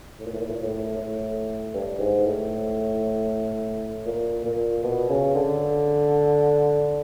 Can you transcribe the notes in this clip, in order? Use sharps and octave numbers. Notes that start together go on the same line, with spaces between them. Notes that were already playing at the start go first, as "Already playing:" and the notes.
A2
A#2
A2
A#2
A2
A#2
A2
A2
G2
G#2
A2
A#2
A#2
B2
C#3
D3